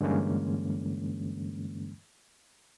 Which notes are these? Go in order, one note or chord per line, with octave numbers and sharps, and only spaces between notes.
G2 D3 E3 G#3 A#3 C#4